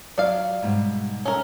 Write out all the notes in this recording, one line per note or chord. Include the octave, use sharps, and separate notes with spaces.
F#3 F4 D5 F5
G#2 B2 G3
C#4 A#4